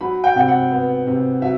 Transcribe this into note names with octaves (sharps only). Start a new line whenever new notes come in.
F#3 B5
G5
C3 G5
F#5
B3
C3
F#3 E5